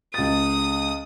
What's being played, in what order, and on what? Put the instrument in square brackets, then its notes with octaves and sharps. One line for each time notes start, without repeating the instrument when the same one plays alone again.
[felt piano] C#2 A6 [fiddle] D#6